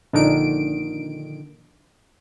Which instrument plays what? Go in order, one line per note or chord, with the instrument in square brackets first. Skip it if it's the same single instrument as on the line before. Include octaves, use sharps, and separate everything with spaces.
[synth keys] A#1 D3 D#3 D7